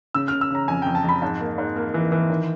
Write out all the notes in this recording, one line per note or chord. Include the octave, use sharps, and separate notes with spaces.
C#3 E6
F6
C#3
E6
C#3 A#5
F2 G#5
G5
F2
A5
F2 B5
G#2 A5
A#3
G#2
A#3
E3
E3
D#3